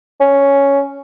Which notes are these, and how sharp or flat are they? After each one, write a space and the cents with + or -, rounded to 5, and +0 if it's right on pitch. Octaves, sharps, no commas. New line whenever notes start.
C#4 +5